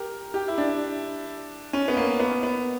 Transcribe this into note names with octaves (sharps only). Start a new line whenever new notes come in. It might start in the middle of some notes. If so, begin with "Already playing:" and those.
Already playing: G4 A#4
G4
E4
D4
C#4
B3
A#3
B3
B3